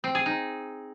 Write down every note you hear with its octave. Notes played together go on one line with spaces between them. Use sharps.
C4
G#4
D#4